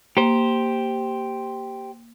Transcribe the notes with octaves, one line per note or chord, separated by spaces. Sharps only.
A#3 G4 C5